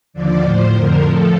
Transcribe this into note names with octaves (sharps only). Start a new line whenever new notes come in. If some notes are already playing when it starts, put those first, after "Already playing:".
D#2 D3 F3 D5
A2 F3 C5
F2 D3 F3 A#4
A2 F3 A4